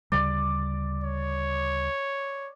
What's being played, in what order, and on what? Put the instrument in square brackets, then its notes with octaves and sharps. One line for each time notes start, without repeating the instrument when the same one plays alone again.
[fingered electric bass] D2 C#3 G3 [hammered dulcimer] D5
[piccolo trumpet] C#5